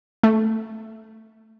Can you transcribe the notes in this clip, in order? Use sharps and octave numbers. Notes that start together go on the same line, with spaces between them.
A3